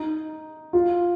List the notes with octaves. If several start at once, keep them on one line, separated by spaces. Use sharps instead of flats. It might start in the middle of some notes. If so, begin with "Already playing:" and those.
Already playing: D#4
F4